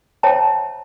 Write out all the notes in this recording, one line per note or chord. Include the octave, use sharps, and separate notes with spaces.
C5 C#5 E5 G5 A5 A#5